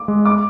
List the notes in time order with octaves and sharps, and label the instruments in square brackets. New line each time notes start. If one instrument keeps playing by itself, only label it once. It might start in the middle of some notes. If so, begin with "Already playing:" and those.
Already playing: [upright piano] D6
[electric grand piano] G#3
[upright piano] D6